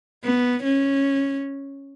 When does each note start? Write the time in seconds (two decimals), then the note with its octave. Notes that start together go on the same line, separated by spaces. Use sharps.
0.24 B3
0.64 C#4